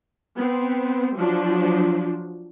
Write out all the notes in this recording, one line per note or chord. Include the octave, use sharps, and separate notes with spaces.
B3 C4
F3 F#3 D4